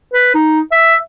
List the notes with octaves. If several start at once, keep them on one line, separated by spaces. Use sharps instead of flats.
B4
D#4
E5